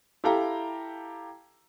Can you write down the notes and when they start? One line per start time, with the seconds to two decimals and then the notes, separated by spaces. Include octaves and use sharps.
0.24 E4 G4 A4 F5 G5 A#5